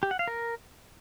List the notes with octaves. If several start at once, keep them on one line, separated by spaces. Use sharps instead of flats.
G4
F#5
F5
A#4